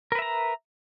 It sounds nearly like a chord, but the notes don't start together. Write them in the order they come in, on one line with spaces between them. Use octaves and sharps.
A#4 B4 E5 A#5